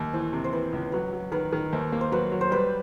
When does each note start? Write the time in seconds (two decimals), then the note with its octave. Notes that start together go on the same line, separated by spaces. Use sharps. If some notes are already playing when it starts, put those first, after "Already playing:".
Already playing: D#2
0.13 E3 C5
0.33 C3
0.44 C5
0.53 E3 B4
0.73 C#2
0.92 F#3 B4
1.13 F#3
1.32 D#3 B4
1.53 D#3
1.73 D#2 C5
1.92 A#3
2.01 C5
2.12 F#3 B4
2.32 F#3
2.41 C5
2.51 G3 B4